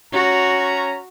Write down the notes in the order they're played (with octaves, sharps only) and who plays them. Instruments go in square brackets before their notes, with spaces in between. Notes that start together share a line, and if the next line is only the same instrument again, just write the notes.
[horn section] C#4 A#5 [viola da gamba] F#4